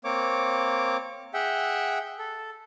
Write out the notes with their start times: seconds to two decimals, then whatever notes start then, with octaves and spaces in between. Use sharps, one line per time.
0.04 A#3 C4 C#5 D6
1.34 G#4 E5 F#5 G5
2.19 A4